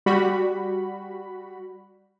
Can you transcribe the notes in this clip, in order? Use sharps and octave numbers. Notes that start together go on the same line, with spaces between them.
G3 F#4 B5